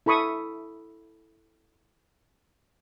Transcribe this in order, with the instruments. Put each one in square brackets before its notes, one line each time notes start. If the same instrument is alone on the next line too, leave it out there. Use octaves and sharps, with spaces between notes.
[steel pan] E4 A4 B5 C#6 D#6